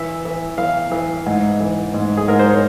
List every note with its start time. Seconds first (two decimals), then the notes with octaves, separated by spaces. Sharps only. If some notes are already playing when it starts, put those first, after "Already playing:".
Already playing: E3 E5
0.25 E3
0.58 E3 F5
0.92 E3
1.26 G#2
1.60 E3
1.94 G#2
2.17 G#4
2.28 G#2 A#4
2.39 C5
2.51 C#5